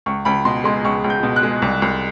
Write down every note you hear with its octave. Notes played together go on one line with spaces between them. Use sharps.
C#2 C#6
C#2 B5
B2 C6
G#3 C6
C#2 C#6
C#2
G6
B2
F#6
G#3
C2
C2